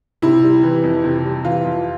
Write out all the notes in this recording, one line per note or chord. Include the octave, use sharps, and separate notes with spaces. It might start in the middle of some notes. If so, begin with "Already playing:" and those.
C3 E4
G3
E3
F2
C3
G3
E3 F4
F2